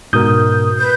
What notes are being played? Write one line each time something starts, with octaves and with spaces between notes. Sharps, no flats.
G#2 B2 A#4 D#6 G6
B4 G6